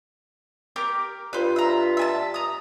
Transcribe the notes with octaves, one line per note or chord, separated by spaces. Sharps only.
G4 A#4 D6
G2 F4 B4 C5
E5 A#5
E5 G#5 A5
A#5 D#6